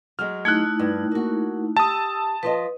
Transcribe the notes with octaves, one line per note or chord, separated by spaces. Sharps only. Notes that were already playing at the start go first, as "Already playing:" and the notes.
F#3 G#3 F6
A3 D#4 E4 F#6 G#6
G2
A#3 F#4
G4 A5 D#6 E6
F3 F4 B4 D#5